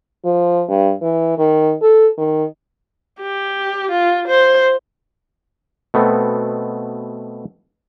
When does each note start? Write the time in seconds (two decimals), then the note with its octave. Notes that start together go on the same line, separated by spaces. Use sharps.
0.24 F3
0.68 G2
1.01 E3
1.38 D#3
1.82 A4
2.18 D#3
3.21 G4
3.91 F4
4.27 C5
5.94 B2 A3 B3 C4